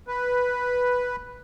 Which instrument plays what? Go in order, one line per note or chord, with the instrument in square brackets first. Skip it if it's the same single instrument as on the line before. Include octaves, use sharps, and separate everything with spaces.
[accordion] B4